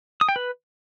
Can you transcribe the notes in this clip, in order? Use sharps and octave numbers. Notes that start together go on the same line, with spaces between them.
D#6
G5
B4